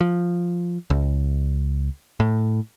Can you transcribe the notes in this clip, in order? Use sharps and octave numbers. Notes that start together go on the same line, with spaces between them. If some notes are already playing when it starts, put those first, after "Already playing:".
F3
C#2
A2